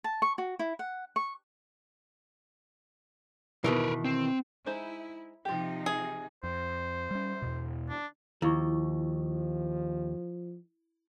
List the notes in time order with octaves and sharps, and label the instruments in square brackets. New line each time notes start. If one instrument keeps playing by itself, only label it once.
[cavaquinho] A5
C#6
F#4
E4
F#5
C#6
[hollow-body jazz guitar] B2 D#3 E3 [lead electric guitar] A#4 B4
[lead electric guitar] C4
[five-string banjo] G#3 D#4 C5 [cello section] E4
[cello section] C3 F3 D#4 [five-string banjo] F4 G4
[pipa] G#4
[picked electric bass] F2 [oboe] C5
[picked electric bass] G3 C#4
E2 B2
[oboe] D4
[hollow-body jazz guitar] D#2 [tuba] F3 [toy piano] E4 C#6